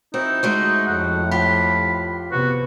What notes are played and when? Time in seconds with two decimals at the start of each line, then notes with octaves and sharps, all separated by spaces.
0.14 C4 D#4 E4 F#4
0.43 G#3 A3 F#4
0.87 F2 A2 F#5
1.31 F4 G4 B5
2.32 C3 B3 F#4